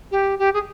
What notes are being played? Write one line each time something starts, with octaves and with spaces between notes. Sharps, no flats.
G4
G4
G#4